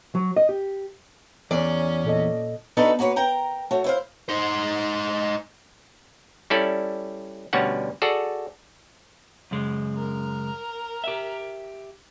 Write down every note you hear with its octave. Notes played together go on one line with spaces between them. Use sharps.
F#3
D#5
G4
E2 C#4 D5
A#2 A4 D#5
B3 D4 D#4 F#4 A4 B4
A#3 F#4 B4 C#5
A#4 G5 A#5
A3 F#4 C#5
E4 C5 F5
D#4 C5
G3 C#4 E4 A4 D5
D2 B2 G3 C#4 F#5
F#4 G#4 A4 D5
F#2 C#3 G#3
A#4
G4 E5